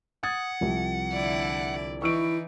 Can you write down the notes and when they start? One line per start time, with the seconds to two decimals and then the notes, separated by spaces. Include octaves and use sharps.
0.23 F#5 D#6 G#6 A6
0.61 C2 F3
1.12 D3 E4 D5
2.02 E3 D#4 E4 C#6 E6 D7